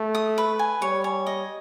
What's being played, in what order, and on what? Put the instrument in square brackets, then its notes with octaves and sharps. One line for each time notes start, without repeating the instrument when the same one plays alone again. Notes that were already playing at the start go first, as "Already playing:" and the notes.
Already playing: [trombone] A3
[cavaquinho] D#6
B4
G#5
[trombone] G3 [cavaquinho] C#5
[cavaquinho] C#5
D#5